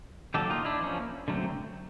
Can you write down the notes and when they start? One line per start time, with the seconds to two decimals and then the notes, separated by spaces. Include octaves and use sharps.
0.34 D#3 F#3 A#3 G4 A4
0.50 D#4 F4
0.65 D4 E4
0.81 F3 A#3 C#4
1.28 D3 F#3 A3 C4